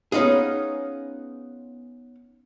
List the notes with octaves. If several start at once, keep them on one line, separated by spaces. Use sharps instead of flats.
B3 C#4 D#4 F4 G#4